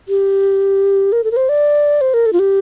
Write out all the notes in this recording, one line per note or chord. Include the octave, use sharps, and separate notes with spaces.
G4
A#4
A4
A#4
C5
D5
C5
A#4
A4
F4
G4